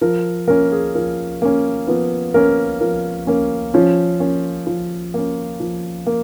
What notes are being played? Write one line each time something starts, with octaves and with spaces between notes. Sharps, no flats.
F3 A#4
A#3 C#4 A#4
G#4
F3 A#4
A#3 C#4
F3 B3 B4
A#3 C#4 A#4
F3 A#4
A#3 C#4
F3 C#4 C#5
A#3 C#4
F3
A#3 C#4
F3
A#3